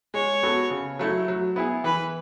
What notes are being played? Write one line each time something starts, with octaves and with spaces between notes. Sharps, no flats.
G#3 C#5
B3 F#4 A4
C#3
F#3 A3 E4
F#3
B3 E4 G#4
E3 B4